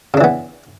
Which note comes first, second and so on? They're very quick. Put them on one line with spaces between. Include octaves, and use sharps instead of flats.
C#3 D4 E3 B3